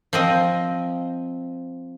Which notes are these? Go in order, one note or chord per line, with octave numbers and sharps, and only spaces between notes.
F3 C4 D#5